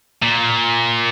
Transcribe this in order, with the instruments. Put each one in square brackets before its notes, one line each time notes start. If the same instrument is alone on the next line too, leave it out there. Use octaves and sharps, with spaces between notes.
[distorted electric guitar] A#2